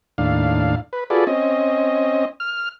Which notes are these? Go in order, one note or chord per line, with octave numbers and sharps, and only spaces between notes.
D#2 A2 D4 F5
B4
F4 F#4 G#4 A4 B4 D5
C4 C#4 D#5
F6